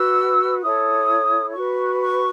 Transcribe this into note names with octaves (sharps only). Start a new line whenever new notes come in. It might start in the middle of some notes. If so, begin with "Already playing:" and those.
Already playing: F#4 B4 E6
E4 A4 C#5 D#6
F#4 B4 C#6
C#6